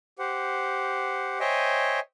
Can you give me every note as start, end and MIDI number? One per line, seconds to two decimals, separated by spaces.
0.19 1.39 67
0.19 1.39 72
0.19 1.39 78
1.40 2.00 72
1.40 2.00 73
1.40 2.00 75
1.40 2.00 76
1.40 2.00 79
1.40 2.00 80